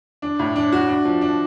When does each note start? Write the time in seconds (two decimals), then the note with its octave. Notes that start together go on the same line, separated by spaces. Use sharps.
0.22 D4
0.39 A2
0.56 D4
0.72 F#4
0.88 D4
1.05 F3
1.22 D4